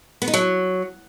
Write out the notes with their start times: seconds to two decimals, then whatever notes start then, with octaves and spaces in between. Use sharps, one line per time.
0.22 B3
0.28 D#4
0.34 F#3